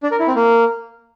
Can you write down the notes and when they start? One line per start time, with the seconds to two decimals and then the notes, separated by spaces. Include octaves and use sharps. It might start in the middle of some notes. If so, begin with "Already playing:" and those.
0.03 D4
0.11 A#4
0.19 E4
0.27 C4
0.36 A#3